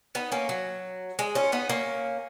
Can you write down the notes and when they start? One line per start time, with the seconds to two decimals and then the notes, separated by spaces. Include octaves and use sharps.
0.15 B3 D#4
0.32 A#3 C#4
0.49 F#3
1.19 G#3
1.35 C#4 F4
1.52 B3 D#4
1.69 A#3 C#4